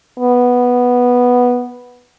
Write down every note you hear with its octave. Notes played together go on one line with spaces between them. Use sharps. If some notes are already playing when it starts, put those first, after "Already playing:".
B3